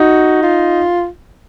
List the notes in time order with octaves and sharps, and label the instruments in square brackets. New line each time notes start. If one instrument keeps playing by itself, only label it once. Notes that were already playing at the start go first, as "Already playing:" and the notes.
Already playing: [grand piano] D#4 [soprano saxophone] F#4
[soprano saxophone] F4